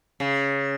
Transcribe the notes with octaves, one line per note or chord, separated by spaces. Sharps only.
C#3